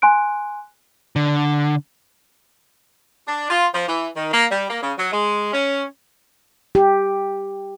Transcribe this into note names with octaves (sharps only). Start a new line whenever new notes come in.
G#5 C6 F#6 D7
D3
D4
F4
F3
E3
D#3
A#3
G3
A#3
C#3
F#3
G#3
C#4
G4